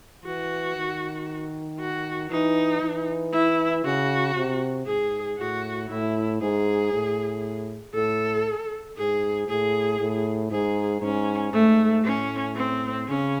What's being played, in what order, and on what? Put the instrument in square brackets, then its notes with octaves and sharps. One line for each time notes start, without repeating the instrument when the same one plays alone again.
[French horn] E3 [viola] F#4
[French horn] D#3
[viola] F#4
[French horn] E3 [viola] D#4
[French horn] E3
[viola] E4
[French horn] C#3 [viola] F#4
[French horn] C3
[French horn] G#2 [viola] G#4
[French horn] A2 [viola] F#4
[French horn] A2 [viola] E4
[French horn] G#2 [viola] G#4
[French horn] A2
[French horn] A2 [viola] A4
[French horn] G#2 [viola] G#4
[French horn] A2 [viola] G#4
[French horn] A2
[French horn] G#2 [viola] G#4
[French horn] G#2 [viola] C#4
[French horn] G#2 [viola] A3
[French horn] A2 [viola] C#4
[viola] C4
[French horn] C#3 [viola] C#4